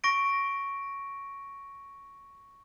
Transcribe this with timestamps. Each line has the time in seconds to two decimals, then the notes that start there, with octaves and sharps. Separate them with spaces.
0.04 C#6 A#6 D7